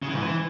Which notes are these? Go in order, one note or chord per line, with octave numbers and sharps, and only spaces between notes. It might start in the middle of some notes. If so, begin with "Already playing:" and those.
C#3
E3
G#2
E3